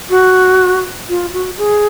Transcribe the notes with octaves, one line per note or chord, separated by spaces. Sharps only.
F#4
F4
F#4
G#4